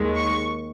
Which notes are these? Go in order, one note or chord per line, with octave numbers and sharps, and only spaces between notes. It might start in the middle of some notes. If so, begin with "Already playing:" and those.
Already playing: D#2 D#3 G#3
C#6